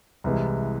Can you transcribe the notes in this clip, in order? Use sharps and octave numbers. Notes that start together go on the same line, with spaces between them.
C2 C3 E3 G#3